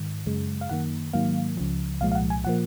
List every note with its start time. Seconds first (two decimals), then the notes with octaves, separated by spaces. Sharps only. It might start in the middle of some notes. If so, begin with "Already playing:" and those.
Already playing: G#2 D#3
0.26 F#2 C#3 G#3
0.61 F5
0.70 F#2 D#3 A#3 F#5
1.13 G#2 D#3 F#3 A#3 F5
1.57 C#2 C#3 F3
2.01 C2 A#2 F3 G#3 F5
2.12 F5
2.15 F#5
2.30 G#5
2.44 A#2 F3 A#3 F#5